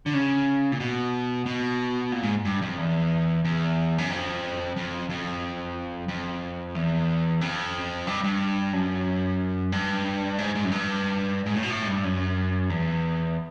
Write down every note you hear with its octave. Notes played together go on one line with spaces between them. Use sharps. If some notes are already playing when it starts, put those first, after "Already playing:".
D3
C#3
A#2
B2
B2
A#2
G#2
G2
F2
E2
E2
F#2
F2
F2
F2
F2
E2
F2
G2
G2
F#2
G2
G#2
G#2
F#2
G2
G#2
A2
B2
A2
G#2
G2
F#2
E2